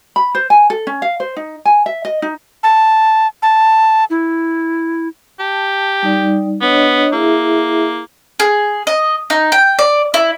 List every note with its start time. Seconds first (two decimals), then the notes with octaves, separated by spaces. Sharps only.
0.16 B5
0.35 C5
0.50 G#5
0.70 A4
0.87 C#4
1.02 F5
1.20 C5
1.37 D#4
1.65 G#5
1.86 E5
2.05 D#5
2.22 D#4
2.63 A5
3.42 A5
4.10 E4
5.40 G4 A5
6.03 G3 D#4 D5
6.61 B3 D4 C#5 D#5
7.12 A#3 E4 G#4 E5
8.40 G#4
8.87 D#5
9.30 D#4
9.52 G5
9.79 D5
10.14 E4